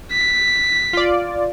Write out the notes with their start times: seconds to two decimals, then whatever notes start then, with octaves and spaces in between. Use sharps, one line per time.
0.12 B6
0.93 F4 D5